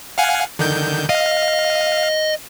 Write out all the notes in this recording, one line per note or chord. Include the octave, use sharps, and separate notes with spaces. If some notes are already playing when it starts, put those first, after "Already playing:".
F5 F#5 G#5
D3 D#3 G6
D#5 F5